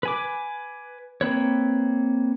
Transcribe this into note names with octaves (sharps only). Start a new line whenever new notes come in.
B4 G#5 D6
A#3 C4 B4 C#5